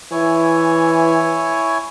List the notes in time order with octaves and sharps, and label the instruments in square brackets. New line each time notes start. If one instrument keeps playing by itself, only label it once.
[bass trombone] E3 [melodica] E4 C#5 G#5